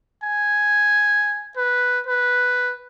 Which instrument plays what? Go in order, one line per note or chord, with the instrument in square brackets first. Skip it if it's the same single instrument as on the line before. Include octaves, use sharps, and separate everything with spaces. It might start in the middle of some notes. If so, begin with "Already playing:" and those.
[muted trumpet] G#5
B4
B4